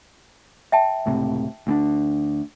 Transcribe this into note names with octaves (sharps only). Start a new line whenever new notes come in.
E5 G5 A5
C#2 A2 C3
D2 C4 D4